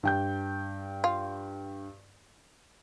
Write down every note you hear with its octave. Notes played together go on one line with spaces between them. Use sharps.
G2 G5 G6
F4